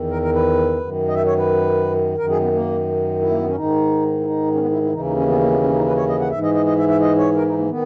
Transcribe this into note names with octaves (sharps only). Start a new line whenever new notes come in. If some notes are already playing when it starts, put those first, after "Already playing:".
Already playing: E2 D#3
A#4
A#4
B4
F#2 D#3
D#5
E5
C#5
B4
F#2 D#3 A#4
G#4
B3
A#3
E4
A#3
B3
C#4
G#2 D#3 D#4
E4
D#4
C#4
B3
E4
E4
D#2 C#3 E3 D#4
D#4
C#4
B3
A#3
B3
C#4
D#4
B4
C#5
D#5
F#5
G#2 E3 E5
D#5
D#5
D#5
E5
E5
D#5
C#5
A#4
E4
D#4
A#3
D#3 B3